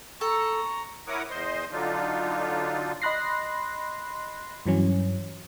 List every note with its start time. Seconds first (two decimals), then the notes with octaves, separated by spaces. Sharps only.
0.21 A4 A#5 C#6
1.08 E4 A#4 C#5 F#5 D6 D#6
1.30 E2 C5 D#5 C6
1.72 D3 F#3 D4 D#4 F4
3.02 D#5 B5 C6 F#6 A#6 C7
4.66 G2 E3 F#3 C#4